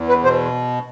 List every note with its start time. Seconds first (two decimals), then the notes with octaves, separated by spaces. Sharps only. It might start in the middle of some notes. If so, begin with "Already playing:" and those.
Already playing: E2
0.09 B4
0.24 B2 C5